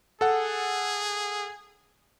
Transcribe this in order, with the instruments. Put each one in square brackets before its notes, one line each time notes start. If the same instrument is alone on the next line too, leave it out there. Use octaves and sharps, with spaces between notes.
[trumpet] G#4 [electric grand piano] A4 F#5